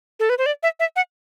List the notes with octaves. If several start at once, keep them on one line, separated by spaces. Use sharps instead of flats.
A4
B4
C5
D5
E5
E5
F#5